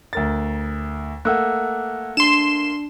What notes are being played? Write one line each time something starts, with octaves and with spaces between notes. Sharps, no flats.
D2 A#4 A6
A3 A#3 F#5 E6 F#6
D4 C6 E7